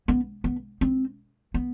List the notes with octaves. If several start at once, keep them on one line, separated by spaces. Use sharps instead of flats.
B3
B3
C4
B3